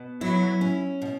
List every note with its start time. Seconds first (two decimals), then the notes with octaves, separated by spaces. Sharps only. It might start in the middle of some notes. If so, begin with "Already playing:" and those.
Already playing: B2
0.21 F#3 E4
0.61 C#4
1.02 B2